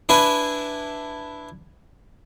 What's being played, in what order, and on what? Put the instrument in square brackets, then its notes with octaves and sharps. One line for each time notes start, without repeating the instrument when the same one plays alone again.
[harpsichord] D4 E4 B4 G#5